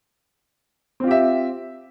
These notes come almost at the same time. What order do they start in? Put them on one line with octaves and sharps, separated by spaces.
C4 F4 G4 E5